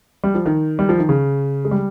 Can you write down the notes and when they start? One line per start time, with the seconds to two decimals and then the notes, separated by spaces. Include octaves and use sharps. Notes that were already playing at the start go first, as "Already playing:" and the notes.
0.24 G3
0.35 F3
0.46 D#3
0.79 G3
0.89 F3
0.99 D#3
1.09 C#3
1.65 G#3
1.71 G3